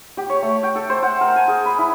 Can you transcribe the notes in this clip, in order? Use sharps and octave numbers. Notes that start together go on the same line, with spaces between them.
G4
C#5
A3
G5
A4
C5
F#5
A#4
G#5
G#4
B5
E4